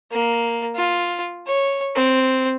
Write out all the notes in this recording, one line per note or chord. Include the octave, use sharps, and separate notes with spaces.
A#3
F4
C#5
C4